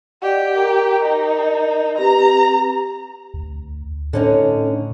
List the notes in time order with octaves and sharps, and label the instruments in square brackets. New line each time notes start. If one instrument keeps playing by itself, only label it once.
[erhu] G4 [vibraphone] D5 D#5 F#5
[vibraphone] A#4 A#5
[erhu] D#4
[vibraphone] C4 G4 B4 [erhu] A#5
[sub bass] D2
[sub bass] A2 [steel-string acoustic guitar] D3 C#4 D#4